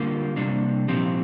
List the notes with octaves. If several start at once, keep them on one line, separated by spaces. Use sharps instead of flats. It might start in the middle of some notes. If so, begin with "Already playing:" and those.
Already playing: D3 G3 A#3 F4
C3 G3 A#3 D4
A#2 F3 C4 G4